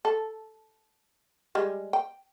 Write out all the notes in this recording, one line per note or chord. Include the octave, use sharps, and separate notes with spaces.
A4
G3 G#3
G5